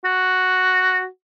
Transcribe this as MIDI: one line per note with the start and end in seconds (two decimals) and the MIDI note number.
0.05 1.06 66